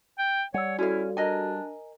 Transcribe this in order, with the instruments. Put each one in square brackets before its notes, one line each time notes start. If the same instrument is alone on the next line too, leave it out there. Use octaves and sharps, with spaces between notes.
[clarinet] G5
[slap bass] G3 [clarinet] C#5 [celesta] F#5 E6 [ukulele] G#5
[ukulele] C#4 F5 [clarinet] E4 [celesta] F#4 A4
[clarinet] D4 [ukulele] A#4 D#5 G#5